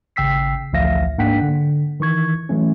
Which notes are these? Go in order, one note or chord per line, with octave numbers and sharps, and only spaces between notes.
G#1 C#3 G5 E6 B6 C7
A1 D2 F3 E5 F5 A#6
G#2 A#3 D4 F#5 G5 B6
D3
D#3 E3 C#6 G#6
E3 F#3 A3 C#4